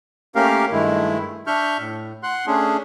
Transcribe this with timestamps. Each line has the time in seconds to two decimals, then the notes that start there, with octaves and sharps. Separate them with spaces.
0.35 A3 A#3 C#4 G4 A#4 F5
0.72 G2 D#3 G#3 A3 E4
1.47 D4 E5 C#6 F6 G6
1.79 A2
2.23 F#5 C6 F#6
2.47 A3 C#4 D4 G#4